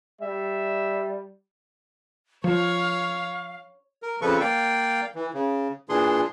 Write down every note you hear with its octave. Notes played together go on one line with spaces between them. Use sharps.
G3 E5
F3 C#5 F5
A#4
F2 C#3 F3 A4 B4 C#6
A#3 D5 F5 G5
E3
C#3
A#2 E3 D4 G#4 C6